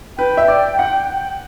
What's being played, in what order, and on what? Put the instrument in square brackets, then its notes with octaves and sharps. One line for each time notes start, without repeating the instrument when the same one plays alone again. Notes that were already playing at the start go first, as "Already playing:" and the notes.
[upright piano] B4 [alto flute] G5
[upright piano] E5
D5
F#5